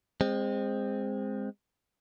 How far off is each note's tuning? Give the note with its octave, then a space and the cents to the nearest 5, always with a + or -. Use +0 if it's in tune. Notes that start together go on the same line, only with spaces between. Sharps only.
G#3 -25 C4 +0